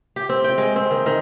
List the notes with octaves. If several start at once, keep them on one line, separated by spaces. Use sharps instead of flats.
G4
C4
G5
G#3
C4
D#3
D#3